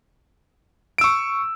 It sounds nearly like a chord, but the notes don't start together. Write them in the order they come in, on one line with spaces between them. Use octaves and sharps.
D7 E6 C#6